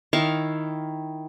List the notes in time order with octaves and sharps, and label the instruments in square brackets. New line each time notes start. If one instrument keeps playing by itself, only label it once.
[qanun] D#3 E4 F5 C#6